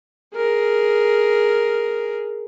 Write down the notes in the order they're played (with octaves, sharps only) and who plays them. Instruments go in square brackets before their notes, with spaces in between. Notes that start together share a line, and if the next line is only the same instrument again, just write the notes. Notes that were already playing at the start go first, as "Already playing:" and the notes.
[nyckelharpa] G#4 A#4